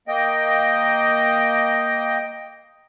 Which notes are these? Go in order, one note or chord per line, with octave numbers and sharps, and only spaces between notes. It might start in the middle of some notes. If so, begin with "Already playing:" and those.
A#3 D#5 G5